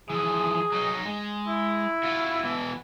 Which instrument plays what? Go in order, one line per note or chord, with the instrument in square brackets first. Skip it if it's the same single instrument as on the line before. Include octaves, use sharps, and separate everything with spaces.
[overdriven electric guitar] E3 F3 [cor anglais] G#4
[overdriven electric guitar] F#3 D#4
G#3
[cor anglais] E4
[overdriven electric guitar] F4 F#4
B2 E3